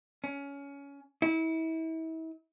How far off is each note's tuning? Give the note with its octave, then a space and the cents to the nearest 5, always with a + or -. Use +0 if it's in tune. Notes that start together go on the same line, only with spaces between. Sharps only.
C#4 +20
E4 -35